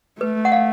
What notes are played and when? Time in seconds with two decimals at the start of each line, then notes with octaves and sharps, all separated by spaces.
0.20 A3 B4
0.45 F#5
0.52 F5